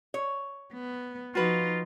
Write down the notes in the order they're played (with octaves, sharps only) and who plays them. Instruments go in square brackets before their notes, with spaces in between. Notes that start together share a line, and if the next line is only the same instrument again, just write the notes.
[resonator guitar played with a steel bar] C#5
[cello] B3
[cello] F3 D#4 [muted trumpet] F4 [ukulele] F#4 B4